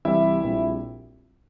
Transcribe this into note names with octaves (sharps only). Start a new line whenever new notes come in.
C2 C3 E3 G3 E4 E5
A#1 A#2 G3 C4